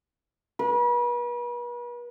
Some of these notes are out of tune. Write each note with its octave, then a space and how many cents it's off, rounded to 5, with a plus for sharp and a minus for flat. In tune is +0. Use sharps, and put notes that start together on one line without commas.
B4 -40